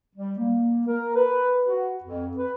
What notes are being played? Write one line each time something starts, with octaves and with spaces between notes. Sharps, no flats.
G3
A#3
A#4
B4
F#4
F2
B4